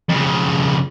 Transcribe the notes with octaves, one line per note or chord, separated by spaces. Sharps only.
F2 C#3